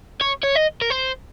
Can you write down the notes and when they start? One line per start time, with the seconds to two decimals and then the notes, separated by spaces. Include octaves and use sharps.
0.21 C#5
0.44 C#5
0.56 D#5
0.82 A#4
0.90 C5